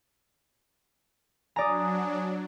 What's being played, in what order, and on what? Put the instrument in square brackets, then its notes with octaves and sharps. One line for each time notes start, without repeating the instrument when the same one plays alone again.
[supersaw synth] F#3 D4 [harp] D5 A#5 [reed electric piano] G#5 D#6